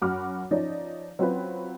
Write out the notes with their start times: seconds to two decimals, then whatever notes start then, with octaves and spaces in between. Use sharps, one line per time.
0.02 F#2 F#4 F#5 B5 D6 F6
0.51 F3 C#4 D#4 D5
1.19 F#3 C4 C#4 F4 B4